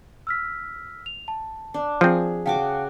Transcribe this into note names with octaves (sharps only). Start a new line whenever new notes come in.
E6 F6 B6
F7
A5
D4
F3 C4 G#4
C#3 F#4 F5 G5 A5 D6